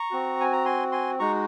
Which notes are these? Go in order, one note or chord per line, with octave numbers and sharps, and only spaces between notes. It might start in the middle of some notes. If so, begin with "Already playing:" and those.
Already playing: A#5 C#6
C4 F#4
G#5
A#5
G#5 C6
G#5 C6
G#3 D#4 F#4 A#5 C#6